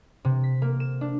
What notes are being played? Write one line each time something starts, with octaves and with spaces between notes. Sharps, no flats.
C3
B6
A#3
E7
D4